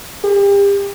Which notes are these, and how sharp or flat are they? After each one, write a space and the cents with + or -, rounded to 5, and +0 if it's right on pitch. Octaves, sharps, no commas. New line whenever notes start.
G4 +35